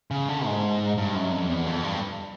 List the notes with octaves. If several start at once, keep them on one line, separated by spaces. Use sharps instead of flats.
C#3
D3
G#2
G2
F#2
F2
E2
F2
G2